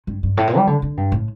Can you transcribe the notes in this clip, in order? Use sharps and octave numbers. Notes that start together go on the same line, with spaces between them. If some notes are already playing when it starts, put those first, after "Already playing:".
G2
G2
A2
A#2
G3
D3
D3
G2
A2